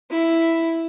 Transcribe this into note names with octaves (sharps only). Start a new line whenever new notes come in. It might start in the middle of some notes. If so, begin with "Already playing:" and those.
E4